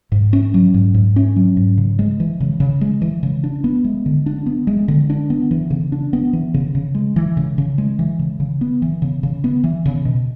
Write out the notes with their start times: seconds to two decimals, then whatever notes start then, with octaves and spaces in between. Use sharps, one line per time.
0.12 G#2
0.33 C#4
0.54 F#3
0.74 G#2
0.94 G#2
1.16 C#4
1.36 F#3
1.57 G#2
1.78 C#3
1.99 G#3
2.20 E3
2.40 C#3
2.60 C#3
2.81 G#3
3.02 E3
3.23 C#3
3.44 D4
3.64 B3
3.85 G#3
4.06 D3
4.26 D4
4.46 B3
4.67 G#3
4.88 D3
5.10 D4
5.30 B3
5.51 E3
5.70 C#3
5.92 D4
6.13 B3
6.33 E3
6.54 C#3
6.75 C#3
6.95 G#3
7.16 E3
7.37 C#3
7.58 C#3
7.78 G#3
7.99 E3
8.19 C#3
8.40 C#3
8.61 B3
8.82 E3
9.02 C#3
9.23 C#3
9.44 B3
9.64 E3
9.86 C#3
10.05 B2